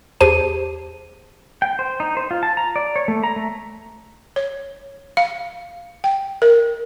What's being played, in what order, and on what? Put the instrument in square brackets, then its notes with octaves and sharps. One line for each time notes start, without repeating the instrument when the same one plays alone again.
[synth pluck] E2 G4 G#4 C5 A5 D#7
[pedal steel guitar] G5
C5
D#4
C5
F4
A5
A#5
D5
C#5
A3
A#5
A3
[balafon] C#5
F5
G5
A#4